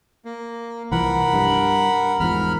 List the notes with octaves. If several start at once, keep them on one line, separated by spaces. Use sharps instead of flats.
A#3
C2 E3 F3 A#4 F#5 B5
G2
E2 G#2 F3 A#4 B5 F6